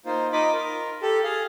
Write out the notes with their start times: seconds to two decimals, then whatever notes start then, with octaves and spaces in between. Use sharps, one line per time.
0.06 A#3 D#4 F4 C5
0.33 D#4 F4 D#5 B5 D6
0.53 F4 A#4
1.02 G4 A4
1.24 G#4 F5